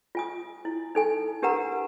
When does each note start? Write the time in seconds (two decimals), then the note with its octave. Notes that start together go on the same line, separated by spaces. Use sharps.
0.15 F4 G#5 D#6
0.65 E4
0.95 D#4 A4 G#5
1.42 D4 G4 A#4 B4 F#5 A#5